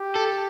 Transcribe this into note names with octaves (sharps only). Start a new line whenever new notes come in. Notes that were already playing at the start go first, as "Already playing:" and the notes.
Already playing: G4
A4